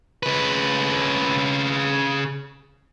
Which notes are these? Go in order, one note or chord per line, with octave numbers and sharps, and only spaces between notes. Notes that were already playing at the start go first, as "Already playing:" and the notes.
C#3 B4